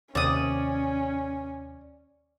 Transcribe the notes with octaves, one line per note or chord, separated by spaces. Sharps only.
D#2 C3 C#4 D5 D#6